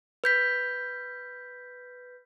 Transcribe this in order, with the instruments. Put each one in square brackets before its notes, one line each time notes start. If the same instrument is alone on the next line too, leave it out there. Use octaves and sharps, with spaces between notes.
[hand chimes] B4 G6 B6